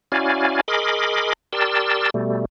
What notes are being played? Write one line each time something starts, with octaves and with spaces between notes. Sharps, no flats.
C#4 E4 F#4 D5 F5 G#5
G#4 A#4 D#5 B5 C6 D6
G4 A#4 D5 A5 C6 E6
B2 G3 A3